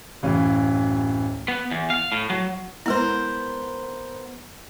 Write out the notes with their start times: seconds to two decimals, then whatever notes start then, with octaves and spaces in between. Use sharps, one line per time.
0.23 D1 F#2 E3 C#4 F5
1.48 B3
1.71 E2
1.90 F5
2.12 A2
2.30 F#3
2.86 G#3 B3 E4 A#4 C5